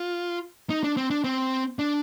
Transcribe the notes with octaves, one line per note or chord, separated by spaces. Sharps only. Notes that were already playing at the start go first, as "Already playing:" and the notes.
Already playing: F4
D#4
D4
C4
D4
C4
D4